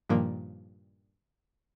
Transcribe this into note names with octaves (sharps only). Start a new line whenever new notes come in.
G2 A#2 D#3 F3 A#3